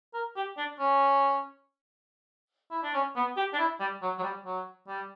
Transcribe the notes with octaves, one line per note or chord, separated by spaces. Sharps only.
A#4
G4
D4
C#4
E4
D4
C#4
B3
G4
D4
E4
G3
F#3
F#3
G3
F#3
G3